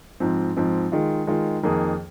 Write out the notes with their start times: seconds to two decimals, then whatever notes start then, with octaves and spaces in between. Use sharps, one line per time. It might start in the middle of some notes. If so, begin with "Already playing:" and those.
0.20 G#2 F3 C4
0.57 G#2 F3 C4
0.92 D#3 G#3 F4
1.27 D#3 G#3 F4
1.63 F2 D#3 A#3 G#4